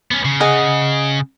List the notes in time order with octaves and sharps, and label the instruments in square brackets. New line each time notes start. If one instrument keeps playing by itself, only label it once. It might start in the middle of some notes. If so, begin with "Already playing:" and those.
[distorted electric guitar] B3 C#4
C#3
[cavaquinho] G#4 D#5 F#5